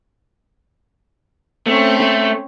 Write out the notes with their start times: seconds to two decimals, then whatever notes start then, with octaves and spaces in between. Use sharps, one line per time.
1.67 A3 C4 C#4
2.00 A3